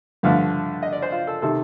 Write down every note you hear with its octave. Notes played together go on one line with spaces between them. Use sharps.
G2 D3 F3 A3 F5
D#5
D5
C5
F4
A4
C3 D#3 A4